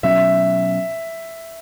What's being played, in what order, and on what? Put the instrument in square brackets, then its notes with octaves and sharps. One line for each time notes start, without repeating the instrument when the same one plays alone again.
[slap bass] B2 F#3 C#4 [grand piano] E5